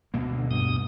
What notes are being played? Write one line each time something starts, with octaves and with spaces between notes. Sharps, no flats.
D2 B2 A#3
D3
G2 D#6